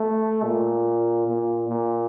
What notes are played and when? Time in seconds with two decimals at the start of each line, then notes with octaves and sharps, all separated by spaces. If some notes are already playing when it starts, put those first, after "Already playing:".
Already playing: A3
0.44 A#2
1.27 A#2
1.69 A#2